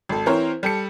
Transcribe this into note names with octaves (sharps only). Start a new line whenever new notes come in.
G#1 A4
E3 C4 A#4 C5 C#5
G3 A4 C#7